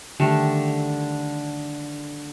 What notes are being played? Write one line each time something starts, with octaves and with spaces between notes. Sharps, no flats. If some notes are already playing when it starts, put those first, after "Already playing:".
D3 D#3 G3 A3